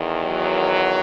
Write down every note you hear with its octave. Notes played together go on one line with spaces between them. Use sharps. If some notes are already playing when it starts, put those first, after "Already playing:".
Already playing: E2 D#3
F#3